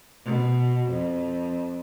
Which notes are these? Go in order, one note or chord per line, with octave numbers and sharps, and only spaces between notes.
B2
F2